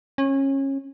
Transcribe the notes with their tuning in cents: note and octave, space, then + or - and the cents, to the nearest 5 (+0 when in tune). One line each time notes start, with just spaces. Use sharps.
C#4 -25